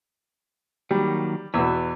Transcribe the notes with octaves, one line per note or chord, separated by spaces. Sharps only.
D#3 F#3 G3 A#3
E2 B2 B4 E6